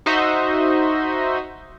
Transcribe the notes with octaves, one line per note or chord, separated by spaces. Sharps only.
D#4 F#4 C5 D#5 E5